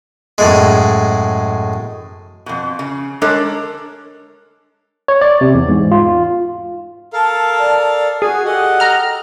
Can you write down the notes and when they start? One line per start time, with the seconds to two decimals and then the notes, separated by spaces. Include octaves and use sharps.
0.38 F#2 A2 G#3
2.46 F2 B2
2.79 C#3
3.22 G#3 D4 A4 A#4 C#5
5.08 C#5
5.21 D5
5.41 C3
5.55 E2
5.68 G#2
5.92 F4
7.13 A4 A#4 F5 A5
7.58 D5
8.22 F#4 G#4 G#5
8.45 G4 A4 D#5 F#5
8.80 A#5 F6